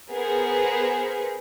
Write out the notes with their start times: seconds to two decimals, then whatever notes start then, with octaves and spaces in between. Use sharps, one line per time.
0.11 B3 G#4 A#4 C5